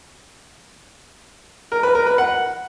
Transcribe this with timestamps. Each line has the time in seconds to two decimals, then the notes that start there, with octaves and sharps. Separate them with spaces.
1.72 A#4
1.83 B4
1.95 A#4
2.07 B4
2.18 F#5